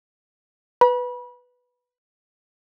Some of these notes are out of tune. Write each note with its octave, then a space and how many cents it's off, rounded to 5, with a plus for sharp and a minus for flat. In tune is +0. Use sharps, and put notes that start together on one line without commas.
B4 +0 B5 -30